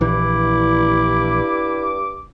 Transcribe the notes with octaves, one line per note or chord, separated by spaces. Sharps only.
A#1 G2 E3 E4 D6